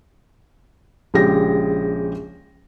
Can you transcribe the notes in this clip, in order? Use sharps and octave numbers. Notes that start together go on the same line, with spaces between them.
A#1 C#3 G#3 G4 A#6